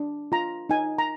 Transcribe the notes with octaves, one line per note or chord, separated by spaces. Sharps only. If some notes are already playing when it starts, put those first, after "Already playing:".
Already playing: D4
F4 A#5
D#4 G#5
A#5